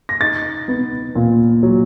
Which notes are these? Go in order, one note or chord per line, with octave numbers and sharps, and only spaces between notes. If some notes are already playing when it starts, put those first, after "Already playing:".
A#6
D#4 A6
B3
A#2
F#3